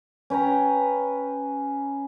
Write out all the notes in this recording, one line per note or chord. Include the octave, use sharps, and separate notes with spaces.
C#4 B4 G5 A#5